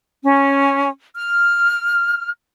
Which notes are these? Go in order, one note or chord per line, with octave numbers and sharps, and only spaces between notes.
C#4
F6